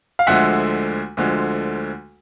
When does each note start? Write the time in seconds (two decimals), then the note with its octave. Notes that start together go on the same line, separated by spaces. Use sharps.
0.19 F5
0.27 D2 D3 F3 G#3 E5 F#5
1.17 D2 D3 F3 G#3